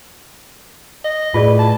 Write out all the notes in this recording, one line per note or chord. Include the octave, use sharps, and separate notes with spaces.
D#5
A2 F4 G#4 B4 D5
A5